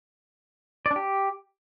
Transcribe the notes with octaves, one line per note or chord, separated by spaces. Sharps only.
D5
D4
G4